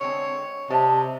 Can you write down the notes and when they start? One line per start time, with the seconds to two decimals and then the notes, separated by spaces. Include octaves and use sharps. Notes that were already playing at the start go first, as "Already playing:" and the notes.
0.01 D3 G#3 C4 C#5
0.70 C3 G3 D#5 A5